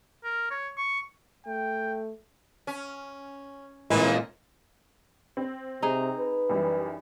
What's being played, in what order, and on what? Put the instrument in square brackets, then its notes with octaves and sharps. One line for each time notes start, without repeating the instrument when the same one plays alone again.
[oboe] A#4
C#5
C#6
[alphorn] A3 [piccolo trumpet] G5
[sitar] C#4
[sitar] F2 C#3 D#4 [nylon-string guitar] A#2 G#3 [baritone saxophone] E3
[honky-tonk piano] C4
[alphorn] C3 [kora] D#4 G#4
[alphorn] B4
[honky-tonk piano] F#2 E3 G3